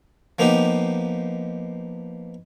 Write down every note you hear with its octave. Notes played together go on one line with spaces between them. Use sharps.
F3 A#3 B3 D#4 G4